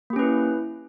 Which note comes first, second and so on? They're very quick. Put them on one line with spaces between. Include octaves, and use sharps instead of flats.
A#3 G4 C#4 B4 E4